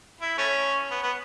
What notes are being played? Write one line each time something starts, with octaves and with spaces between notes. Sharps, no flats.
E4
A3 C#4
B3
B3